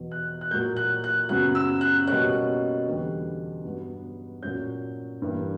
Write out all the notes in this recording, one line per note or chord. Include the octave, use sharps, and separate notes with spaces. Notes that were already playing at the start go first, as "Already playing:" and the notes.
Already playing: E2 B2 F#3
F#6
F#6
A#2 F#3 A#3 G6
F#6
F#6
F#2 C#3 F#3 B3 F#6
E6
F#6
B2 G3 A#3 C#4 F#6
E2 D3 G3
G2 F#3 B3
A#2 F#3 C#4 G6
G2 E3 A#3